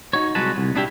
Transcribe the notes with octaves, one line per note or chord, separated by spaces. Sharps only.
D#4 F#4 C#5
C2 F#3 G#3 F#4 B4 A5
C2
B3 D4 E4 G4 E5